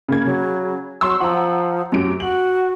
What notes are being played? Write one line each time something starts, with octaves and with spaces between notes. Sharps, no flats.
C#3 A#3 G#6
C#3 F#3
F#3 C6 C#6 E6
F3 F#5 A#5
F#2 F#3 G4 D7
F#4 F#7